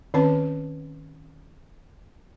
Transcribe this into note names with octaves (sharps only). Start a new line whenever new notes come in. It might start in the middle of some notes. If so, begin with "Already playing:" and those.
D#3 C4 C#4 B4 A5